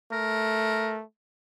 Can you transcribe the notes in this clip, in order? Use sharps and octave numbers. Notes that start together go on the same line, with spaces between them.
A3 A#4